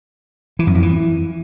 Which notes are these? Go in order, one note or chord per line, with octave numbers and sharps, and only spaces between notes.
E3
F#2
F2
E3